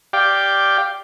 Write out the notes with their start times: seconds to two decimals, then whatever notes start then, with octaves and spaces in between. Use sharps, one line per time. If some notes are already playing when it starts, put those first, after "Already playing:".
0.13 G4 D5 F5 G5